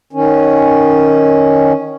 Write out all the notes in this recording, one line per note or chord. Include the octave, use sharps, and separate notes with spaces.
D#3 C#4